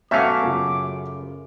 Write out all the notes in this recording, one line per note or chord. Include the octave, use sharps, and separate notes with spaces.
B2 F#3 A3 C#4 E5 F5 D6 C#7
F#2 C#3 F4